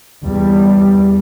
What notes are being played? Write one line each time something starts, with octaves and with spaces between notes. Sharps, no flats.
E2 G3